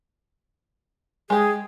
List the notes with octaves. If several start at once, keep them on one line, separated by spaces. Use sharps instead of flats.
G#3 G4 G#4